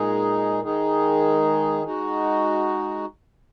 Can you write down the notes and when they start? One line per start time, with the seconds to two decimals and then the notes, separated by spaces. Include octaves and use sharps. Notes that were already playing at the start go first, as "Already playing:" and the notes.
Already playing: A#2 G#3 D#4 G#4
0.62 D#3 G#3 D#4 G#4
1.83 G#3 D#4 F#4